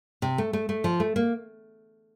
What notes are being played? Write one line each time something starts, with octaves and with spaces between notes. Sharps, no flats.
C3
A3
A3
A3
F3
A3
A#3